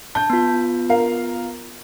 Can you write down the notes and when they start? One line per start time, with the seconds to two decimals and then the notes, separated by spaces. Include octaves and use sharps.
0.15 A5 G6
0.30 B3 F4
0.90 A#4 F5